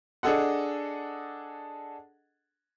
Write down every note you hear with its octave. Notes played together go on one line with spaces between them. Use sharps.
D4 G#4 A4 D#5 F#5